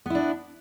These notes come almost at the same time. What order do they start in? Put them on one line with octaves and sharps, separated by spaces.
B3 E4 D4